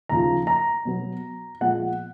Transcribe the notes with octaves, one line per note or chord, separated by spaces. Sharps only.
D#2 C#3 F3 A#5
A#5
B2 F#3 B3
A#2 F3 G#3 B3 F#5